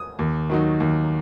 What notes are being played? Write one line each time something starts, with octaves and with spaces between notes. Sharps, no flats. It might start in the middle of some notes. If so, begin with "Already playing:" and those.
Already playing: D#6
D#2
D#3 F#3 D#4
D#2